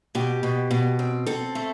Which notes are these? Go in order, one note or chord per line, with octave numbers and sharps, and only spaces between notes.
B2 G4
B2
B2
C4
C4 A4
A3